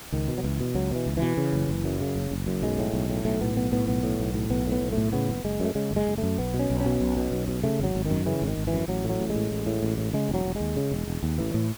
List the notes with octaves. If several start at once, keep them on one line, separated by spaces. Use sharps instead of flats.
C#2 D#3
B2
F#3
C#2 E3
B2
C#2 F#3
B2 E3
C#2
E3
B2
C#3
F#1
F#1
F#2
C#3
F#1
F#1
F#2
B1 G#3
A2
B1
A2
B1 A3
A2 B3
B1 B3
A2 B3
B1 B3
A2
B1
A2
B1 B3
A2
B3
B1
A2 A3
C#3 B3
F#1
F#1 G#3
F#2 A3
C#3 G#3
F#1
G#3
F#1
F#2 A3
B1 B3
B2
C#4
B1
C#4
B2
B1
B2
B1
B2
C#3 A3
G#1 F#3
G#1
F#2 D#3
C#3 E3
G#1
D#3
G#1
E3
F#2
A1 F#3
A2
F#3
A1
G#3
A2
A1
A2
A1
A2
C#3 G#3
E1
F#3
E1
D#2 G#3
C#3
E1
E1
D#2
A1 E3
A2